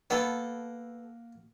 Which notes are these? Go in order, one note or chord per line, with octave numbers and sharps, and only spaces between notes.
A#3 B3 A4 F#5